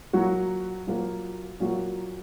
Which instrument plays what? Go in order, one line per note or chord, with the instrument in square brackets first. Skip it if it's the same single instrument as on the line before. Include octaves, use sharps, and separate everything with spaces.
[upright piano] A#2 F#3 A#3 F#4
A#2 F#3 A#3 F#4
A#2 F#3 A#3 F#4